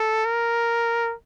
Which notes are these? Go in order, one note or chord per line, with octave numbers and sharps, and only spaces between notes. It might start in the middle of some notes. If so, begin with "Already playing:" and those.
Already playing: A4
A#4